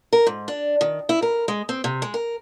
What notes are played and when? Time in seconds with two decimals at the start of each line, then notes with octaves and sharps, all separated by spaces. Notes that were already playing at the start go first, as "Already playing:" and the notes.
0.13 A#4
0.27 G#2
0.48 D4
0.81 D#3
1.09 E4
1.22 A#4
1.48 G#3
1.69 C4
1.84 C3
2.02 G#3
2.14 A#4